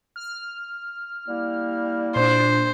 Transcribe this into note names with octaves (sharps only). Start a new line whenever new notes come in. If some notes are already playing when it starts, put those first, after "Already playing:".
F6
G3 A#3 E4
A#2 D4 C5